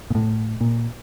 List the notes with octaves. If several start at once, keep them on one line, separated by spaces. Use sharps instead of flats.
A#2
A2
A#2